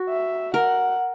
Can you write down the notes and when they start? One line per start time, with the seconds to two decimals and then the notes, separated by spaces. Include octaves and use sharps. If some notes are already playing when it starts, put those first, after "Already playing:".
Already playing: F#4
0.09 E5
0.54 A#4 F#5